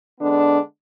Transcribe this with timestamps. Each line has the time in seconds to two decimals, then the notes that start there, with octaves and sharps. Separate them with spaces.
0.20 D3 G#3 B3 D4